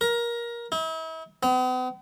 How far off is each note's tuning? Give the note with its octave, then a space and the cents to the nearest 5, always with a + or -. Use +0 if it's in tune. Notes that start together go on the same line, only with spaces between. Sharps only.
A#4 +20
E4 -40
B3 +45